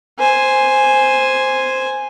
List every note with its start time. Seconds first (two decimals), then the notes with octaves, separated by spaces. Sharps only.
0.19 C5 G#5